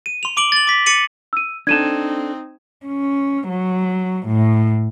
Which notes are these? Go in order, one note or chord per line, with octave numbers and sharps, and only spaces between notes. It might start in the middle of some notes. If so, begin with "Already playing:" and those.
D#7
C6 F7
C6 D6 D7 F#7 G7
A6 F#7
D6 B6
D6 A6 C#7 D#7 F#7
E6 D#7
C4 D4 D#4 A4 G#6 D#7 E7
C#4
F#3
A2